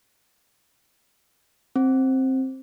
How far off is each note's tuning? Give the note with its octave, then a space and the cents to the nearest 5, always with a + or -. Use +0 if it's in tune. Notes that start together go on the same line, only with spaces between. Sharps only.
C4 +10